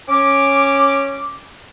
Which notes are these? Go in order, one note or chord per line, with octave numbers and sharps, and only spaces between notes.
C#4 D6